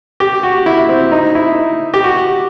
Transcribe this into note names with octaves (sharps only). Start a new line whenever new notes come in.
G4
F#4
E4
C4
D#4
E4
G4
F#4